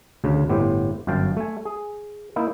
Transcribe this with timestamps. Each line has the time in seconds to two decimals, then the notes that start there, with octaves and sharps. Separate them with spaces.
0.24 D2 C#3
0.49 G1 A2 B3 G4 C5
1.07 G1 F#2 F5 G5 A5
1.37 A3 G#5
1.65 G#4
2.36 A#3 D#4 E4